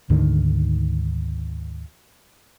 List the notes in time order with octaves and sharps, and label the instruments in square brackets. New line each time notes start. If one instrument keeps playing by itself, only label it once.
[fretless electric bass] D2 G#2 D3 D#3